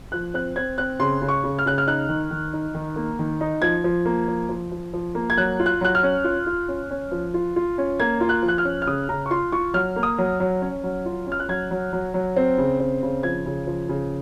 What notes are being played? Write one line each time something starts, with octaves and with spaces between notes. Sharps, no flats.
F3 F#6
C4 F#6
C4 G#6
C4 F#6
C#3 C6
C#3
C#6
C#3
F6
C#3 F#6
F6
D#4 F#6
D#3
D#3
D#4
D#3
A#3
D#3
D#4
F3 G#6
F3
A#3
F3
F3
F3
F3
A#3
G#6
F#3 F#6
F4
F#6
F#3 F#6
F6
C#4
F4
F4
C#4
C#4
F3
F4
F4
C#4
A#3 G#6
F4
F#6
F3
F#6
F6
C#4
F6
C#3 D#6
C#3 A#5
C#6
F4 C6
F4 C#6
F#3 F6
A#3
D#6
F#3
F#3
C#4
F#3
F4
C#4
F6
F#6
F#3 G#6
F#3
F#3
F#3
C4
C#3
C4
C#3
F3 G#6
C#3
F3
C#3